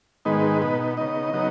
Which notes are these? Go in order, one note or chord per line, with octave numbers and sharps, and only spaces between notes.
G#2 D#3 G#3 B3 D#4 B4
B2 B3 D#4
C#3 B3 D#4 D#5
C#3 F#3 B3 D#4